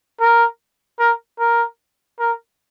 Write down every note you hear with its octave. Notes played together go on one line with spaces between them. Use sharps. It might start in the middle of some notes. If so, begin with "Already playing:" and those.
A#4
A#4
A#4
A#4